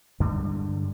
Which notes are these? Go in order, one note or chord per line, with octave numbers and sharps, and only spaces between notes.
G2 D3 G3 G#3